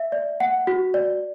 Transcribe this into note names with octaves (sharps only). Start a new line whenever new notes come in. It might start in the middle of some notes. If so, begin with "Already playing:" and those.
Already playing: E5
D5
F#5
F#4
D5